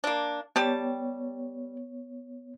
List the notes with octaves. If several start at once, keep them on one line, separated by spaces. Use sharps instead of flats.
A#3 D4
G3 B3 G4 C#5 A5